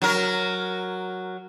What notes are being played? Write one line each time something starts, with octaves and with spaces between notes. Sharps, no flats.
F#3 A#4